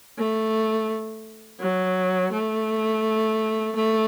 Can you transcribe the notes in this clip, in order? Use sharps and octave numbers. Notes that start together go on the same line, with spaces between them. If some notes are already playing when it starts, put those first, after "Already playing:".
A3
F#3
A3
A3